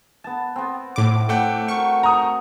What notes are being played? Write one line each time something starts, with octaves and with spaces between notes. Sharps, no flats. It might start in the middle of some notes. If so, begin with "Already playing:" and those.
B3 A5
B3 C4
A2 D6
A3 F#5 G5
F#4 A#4 C#6
A#5 D#6